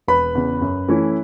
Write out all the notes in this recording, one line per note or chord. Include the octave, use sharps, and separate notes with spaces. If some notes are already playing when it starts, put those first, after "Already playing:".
E1 B4 B5
E2 C#3
F#2
E3 A3 C#4 E4